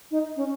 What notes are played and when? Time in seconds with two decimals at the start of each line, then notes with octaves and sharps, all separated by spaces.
0.11 D#4
0.37 C#4